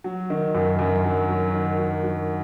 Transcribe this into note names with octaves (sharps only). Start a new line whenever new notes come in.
F#3
D#3
F#2
F#2
F#3
F#3
D#3
F#3
F#3